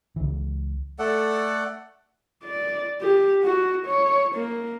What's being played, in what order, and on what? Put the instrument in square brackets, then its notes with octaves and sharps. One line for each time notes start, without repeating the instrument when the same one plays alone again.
[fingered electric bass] C#2 E3
[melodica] A3 A4 D5 F#5
[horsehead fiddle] D5
G4
F#4
C#5
A#3